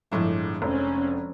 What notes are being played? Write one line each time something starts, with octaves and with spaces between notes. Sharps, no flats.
G1 A2 F3 G#3 D4
F1 C4 C#4